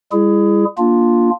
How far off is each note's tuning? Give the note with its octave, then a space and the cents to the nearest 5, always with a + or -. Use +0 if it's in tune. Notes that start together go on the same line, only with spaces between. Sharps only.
G3 +40 E4 +30 G#4 +5
A#3 +10 D4 +0 F4 +0